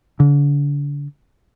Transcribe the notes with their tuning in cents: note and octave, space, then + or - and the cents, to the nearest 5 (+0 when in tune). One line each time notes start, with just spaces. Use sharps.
D3 -35